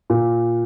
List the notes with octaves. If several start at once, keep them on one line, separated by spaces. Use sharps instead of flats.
A#2